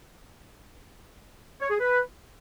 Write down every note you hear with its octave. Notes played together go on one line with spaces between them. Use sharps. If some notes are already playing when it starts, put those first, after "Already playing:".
C#5
G#4
B4